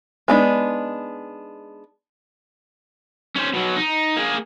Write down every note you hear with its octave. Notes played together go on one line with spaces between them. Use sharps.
G#3 B3 D4 D#4
C#4 C5
B2 F#3
D#4
A#3 G#4